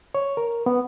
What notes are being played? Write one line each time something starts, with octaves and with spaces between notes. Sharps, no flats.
C#5
A#4
B3